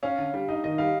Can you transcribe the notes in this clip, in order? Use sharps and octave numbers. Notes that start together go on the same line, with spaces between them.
C#4 F5
D3
G3
D#4 D#5
D#3 D#5
G3 F5